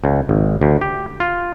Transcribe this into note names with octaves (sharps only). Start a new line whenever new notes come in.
C#2
G#1
D2
G4
F4